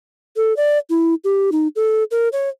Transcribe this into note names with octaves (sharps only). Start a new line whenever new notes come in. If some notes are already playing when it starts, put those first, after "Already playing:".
A4
D5
E4
G4
D#4
A4
A#4
C#5